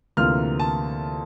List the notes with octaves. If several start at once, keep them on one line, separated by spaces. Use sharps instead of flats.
D2 C3 E3 A#3 F4 F6
A5